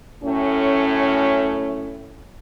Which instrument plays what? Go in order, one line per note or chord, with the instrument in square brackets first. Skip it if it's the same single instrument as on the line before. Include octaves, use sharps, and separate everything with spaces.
[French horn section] F#2 A2 A3 C#4